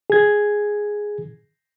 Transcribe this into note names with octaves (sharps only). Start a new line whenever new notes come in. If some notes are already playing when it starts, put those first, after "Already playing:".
G#4 G#6